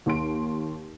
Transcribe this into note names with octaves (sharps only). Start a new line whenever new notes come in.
D#2 C6 D7